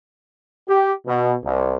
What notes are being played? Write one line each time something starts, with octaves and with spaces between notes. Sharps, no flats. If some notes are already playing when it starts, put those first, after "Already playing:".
G4
B2
C2